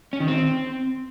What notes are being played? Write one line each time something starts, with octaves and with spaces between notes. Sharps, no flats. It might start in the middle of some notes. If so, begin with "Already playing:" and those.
C#4
D#3
C4